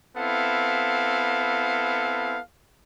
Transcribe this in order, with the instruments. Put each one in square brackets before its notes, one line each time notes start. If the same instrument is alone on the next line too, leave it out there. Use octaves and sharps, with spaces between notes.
[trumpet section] B3 C4 E4 A4 F5